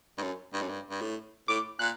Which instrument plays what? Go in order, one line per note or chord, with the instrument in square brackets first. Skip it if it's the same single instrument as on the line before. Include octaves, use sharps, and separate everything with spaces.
[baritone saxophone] G2
F#2
G2
F#2
G2
G2
A2
[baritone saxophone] A2 [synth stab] D6
[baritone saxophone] A#2 [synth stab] F#6